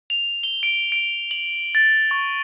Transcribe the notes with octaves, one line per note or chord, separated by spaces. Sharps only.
F7
G7
D7
D7
F#7
A6
C#6